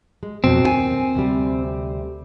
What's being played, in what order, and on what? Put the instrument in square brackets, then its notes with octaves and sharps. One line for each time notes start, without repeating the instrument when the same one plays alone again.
[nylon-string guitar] G#3
[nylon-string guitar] F2 B2 F#3 [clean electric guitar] C4
[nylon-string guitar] D#2 F4 G#5
D2 C3 G3